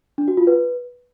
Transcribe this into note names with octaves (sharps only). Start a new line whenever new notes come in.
D4
F#4
F4
B4